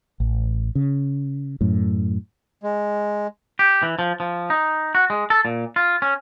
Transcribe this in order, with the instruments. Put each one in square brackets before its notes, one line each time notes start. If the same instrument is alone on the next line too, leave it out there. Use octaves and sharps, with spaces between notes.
[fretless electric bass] A1
C#3
F#2 A2
[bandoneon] G#3
[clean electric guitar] G4
E3
F3
F3
D#4
F#4
G#3
A4
A#2
F4
C#4